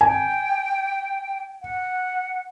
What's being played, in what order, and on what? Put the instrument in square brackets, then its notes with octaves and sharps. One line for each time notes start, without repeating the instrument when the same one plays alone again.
[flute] G5 [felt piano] G#5
[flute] F#5